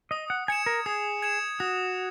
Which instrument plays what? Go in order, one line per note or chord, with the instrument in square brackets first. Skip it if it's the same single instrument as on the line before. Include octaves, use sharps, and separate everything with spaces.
[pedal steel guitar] D#5 [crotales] D#6
[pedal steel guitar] F#5
[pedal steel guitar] G#5 [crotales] G#6 C#7 E7
[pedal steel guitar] A#4
[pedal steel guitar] G#4 [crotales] D#6
[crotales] G#6 C#7 E7
[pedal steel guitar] F#4 [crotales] D#6